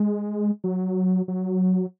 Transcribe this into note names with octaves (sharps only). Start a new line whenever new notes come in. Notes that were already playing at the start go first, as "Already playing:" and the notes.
Already playing: G#3
F#3
F#3